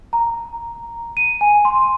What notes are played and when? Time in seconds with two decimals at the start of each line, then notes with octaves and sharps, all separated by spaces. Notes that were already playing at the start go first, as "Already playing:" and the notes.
0.13 A#5
1.17 D#7
1.41 G#5
1.65 C6